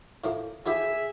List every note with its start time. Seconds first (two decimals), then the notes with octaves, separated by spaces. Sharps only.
0.24 A2 F3 A#3
0.66 F3 E4 G4 G#4 E5